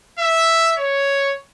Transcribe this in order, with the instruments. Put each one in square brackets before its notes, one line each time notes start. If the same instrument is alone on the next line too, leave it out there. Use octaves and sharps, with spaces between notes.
[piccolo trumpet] E5
C#5